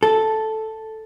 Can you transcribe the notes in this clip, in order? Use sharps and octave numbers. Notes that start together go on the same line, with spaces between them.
A4